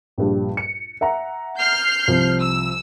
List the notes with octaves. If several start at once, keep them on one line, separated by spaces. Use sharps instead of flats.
A#1 G2 G3
C#7
E5 F#5 A#5
F6 G6 C7
C2 F3
E6